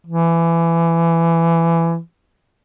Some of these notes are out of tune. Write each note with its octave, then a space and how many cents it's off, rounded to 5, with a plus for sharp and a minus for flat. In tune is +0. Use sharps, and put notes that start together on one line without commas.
E3 +20